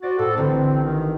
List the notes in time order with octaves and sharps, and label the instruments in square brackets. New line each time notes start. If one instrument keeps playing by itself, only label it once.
[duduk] F#4 [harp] C5 D5 A6
[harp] A2 [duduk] A4
[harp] A1 D3 B4 [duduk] C4
[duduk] D#3